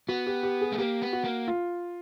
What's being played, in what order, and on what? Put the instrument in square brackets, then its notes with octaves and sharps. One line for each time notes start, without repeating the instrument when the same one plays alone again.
[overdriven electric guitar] B3 [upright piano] F#4
[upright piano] G4
G4
G#4
[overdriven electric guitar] A3
[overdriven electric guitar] A#3 [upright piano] G4
[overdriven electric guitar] B3
[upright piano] F#4
[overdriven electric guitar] A#3
[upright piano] F4